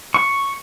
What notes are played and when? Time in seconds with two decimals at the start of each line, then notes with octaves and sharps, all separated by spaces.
0.14 C#6